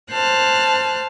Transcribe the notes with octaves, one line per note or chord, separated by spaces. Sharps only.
C5 A5 F6 F#6